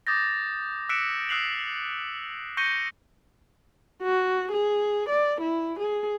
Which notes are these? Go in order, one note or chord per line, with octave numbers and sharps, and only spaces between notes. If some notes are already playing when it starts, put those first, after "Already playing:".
D6 D#6 G6 A6 A#6
E6 F#6 B6 C#7 D7 E7
D#6 E6 F#6 C7 F7 F#7
C#6 G6 A#6 C#7 D#7 G7
F#4
G#4
D5
E4
G#4